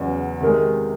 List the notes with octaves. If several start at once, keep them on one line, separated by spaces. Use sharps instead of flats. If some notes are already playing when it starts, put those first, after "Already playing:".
Already playing: E2 C#3 F#3
C3 D#3 G#3